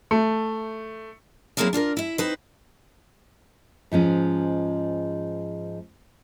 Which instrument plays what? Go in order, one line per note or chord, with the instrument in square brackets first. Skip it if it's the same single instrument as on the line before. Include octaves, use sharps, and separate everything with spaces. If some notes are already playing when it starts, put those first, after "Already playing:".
[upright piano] A3
[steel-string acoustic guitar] F#3 A#3 C4 E4 G#4 A#4
D4 F4 G4 A#4
E4 E5
C4 D#4 B4 C5
[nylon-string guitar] G#2 F3 G#3 C#4